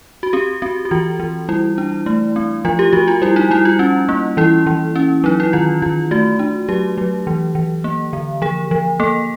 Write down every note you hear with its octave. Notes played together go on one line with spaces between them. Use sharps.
F#4
C4 G4
C4 F#4
F#4
E3 F4
E3
G3 E4
D4
A3
C4
F3 F4
G4
F3 F#4
F4
G3 E4
D#4
G3 E4
F4
C#4
A#3
E3 E4
E3
C#4
F#3 D#4
E4
D#3 F4
D#3 F4
A3 F#4
D4
F#3 G4
F#3
E3
E3
A#3
D3
F3 G#4
F3
A#3 A4